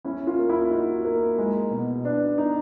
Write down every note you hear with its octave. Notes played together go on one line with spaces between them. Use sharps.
C#4 E4
F4
A#3
E4
D#4 F#4
A#3
G#3
B2
B3 D4
D#4